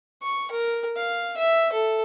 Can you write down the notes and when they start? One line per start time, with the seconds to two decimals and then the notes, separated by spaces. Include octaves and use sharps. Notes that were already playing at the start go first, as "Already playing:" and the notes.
0.22 C#6
0.51 A#4
0.97 F5
1.37 E5
1.72 A4